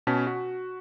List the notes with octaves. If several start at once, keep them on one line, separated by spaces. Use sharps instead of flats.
B2 C#4 A5 B6
F#4